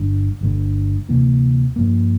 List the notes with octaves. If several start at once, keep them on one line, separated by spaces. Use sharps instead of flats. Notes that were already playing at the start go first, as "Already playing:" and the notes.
Already playing: G1 G2 D3
G1 G2 D3 A3
D2 C3 E3 A#3
G2 F3 A#3